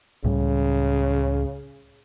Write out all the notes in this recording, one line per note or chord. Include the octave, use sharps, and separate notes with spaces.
C#2 A2 C#3 G3